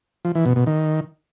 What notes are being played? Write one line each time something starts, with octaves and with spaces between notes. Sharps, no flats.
F3
E3
B2
B2
D#3